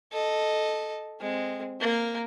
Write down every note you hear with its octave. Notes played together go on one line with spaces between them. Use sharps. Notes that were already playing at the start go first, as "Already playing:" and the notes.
A4 D#5
G#3 C4
A#3 A#4